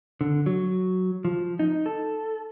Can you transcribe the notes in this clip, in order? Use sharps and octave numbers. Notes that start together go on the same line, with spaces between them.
D3
F#3
F3
D#4
A4